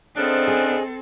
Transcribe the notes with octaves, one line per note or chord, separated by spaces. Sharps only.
C#3 B3 C4 D4 A4 C5 D#5
G#4